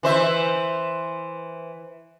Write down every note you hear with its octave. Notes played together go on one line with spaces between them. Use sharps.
E3 C5 E5